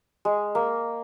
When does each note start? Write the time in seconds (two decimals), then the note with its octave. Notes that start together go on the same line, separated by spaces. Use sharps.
0.25 G#3
0.55 A#3